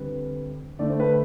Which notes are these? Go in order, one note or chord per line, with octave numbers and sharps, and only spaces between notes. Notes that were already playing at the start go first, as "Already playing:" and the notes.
Already playing: D3 G3 C4 B4
D3 A3 D4 D5
C5
B4